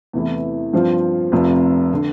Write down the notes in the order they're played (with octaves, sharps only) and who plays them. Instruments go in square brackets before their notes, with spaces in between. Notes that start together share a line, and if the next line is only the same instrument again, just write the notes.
[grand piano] E2 C3 E3 A3 E4
G2 F3 C4 F4
F1 F2 C3
D3